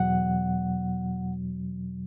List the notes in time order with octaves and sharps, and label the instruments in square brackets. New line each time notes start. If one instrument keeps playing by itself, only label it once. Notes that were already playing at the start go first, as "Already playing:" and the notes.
Already playing: [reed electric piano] E2 B2 F#3 F#5